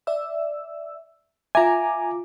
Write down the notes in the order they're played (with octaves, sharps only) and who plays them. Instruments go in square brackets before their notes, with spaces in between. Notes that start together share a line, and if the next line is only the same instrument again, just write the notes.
[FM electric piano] D5 E5 E6
[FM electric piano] F4 D6 [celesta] E5 [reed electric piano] G#5 A#5